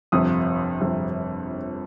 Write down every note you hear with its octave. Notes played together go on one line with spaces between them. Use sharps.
G1 F2 C3 D#6
G1 F2 C3